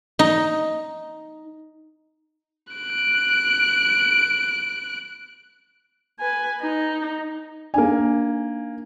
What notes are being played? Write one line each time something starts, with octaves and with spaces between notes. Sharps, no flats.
D#4
F#6 D7
B4 G#5
D#4
A#3 D4 D#4 G#5